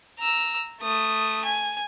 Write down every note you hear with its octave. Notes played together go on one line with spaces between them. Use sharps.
A#5 E6
A3 D#6
G#5